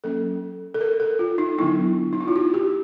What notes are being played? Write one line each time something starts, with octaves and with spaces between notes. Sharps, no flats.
F#3 A#3 C#4 A4
A4
A#4
A4
F4
D#4
D3 F#3 B3 D4 E4
D#4
E4
F4
F#4
G4